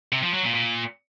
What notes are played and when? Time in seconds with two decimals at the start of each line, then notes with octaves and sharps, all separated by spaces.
0.12 C3
0.23 F3
0.33 F#3
0.44 A#2
0.55 A#2